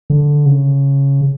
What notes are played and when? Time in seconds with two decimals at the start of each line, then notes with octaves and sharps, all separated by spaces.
0.10 D3
0.46 C#3